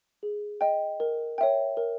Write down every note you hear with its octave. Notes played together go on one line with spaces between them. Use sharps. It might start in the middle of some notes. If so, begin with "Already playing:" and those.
G#4
D#5 G5
A#4
C#5 E5 G5
A#4